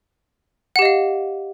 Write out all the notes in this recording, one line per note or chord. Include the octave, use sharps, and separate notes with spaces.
G4 D#5 F5 F#5